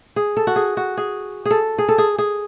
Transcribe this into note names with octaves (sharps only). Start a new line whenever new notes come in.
G#4
A4
F#4
G#4
F#4
G#4
G#4
A4
G#4
A4
G#4
G#4